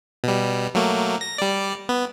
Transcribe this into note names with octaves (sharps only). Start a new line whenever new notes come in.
B2 G3
F#3 A3 A#3
A#6
G3 D5
B3